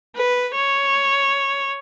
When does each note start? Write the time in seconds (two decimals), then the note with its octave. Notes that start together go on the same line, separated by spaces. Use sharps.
0.16 B4
0.55 C#5